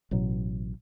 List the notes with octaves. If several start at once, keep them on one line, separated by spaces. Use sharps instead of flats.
A1 B2 F#3